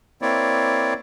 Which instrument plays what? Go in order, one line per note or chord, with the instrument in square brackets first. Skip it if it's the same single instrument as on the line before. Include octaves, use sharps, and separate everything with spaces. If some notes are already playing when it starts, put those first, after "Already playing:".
[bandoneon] A#3 C4 E4 C#5 D5